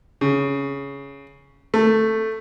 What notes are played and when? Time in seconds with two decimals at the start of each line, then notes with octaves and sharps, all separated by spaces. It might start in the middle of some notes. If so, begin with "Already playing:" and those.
0.21 C#3
1.74 A3